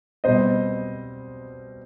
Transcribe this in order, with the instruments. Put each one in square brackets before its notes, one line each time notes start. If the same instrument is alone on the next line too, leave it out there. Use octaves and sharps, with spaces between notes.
[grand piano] B2 G3 C4 C5 D#5